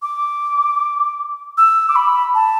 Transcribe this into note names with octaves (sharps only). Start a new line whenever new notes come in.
D6
E6
D6
B5
A5